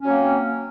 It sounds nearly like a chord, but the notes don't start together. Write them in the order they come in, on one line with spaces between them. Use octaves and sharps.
C#4 F#3 A#3 C4